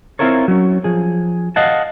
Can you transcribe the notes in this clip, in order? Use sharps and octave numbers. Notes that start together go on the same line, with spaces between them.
C4 C#4 E4 F4 A#4 C#5
F#3 C#4
F3 G#4
D#5 F5 F#5 A5